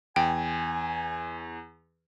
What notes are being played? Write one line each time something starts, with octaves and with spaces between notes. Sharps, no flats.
E2 G5 G#5